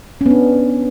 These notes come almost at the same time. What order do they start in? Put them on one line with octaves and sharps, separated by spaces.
C#4 B3 D4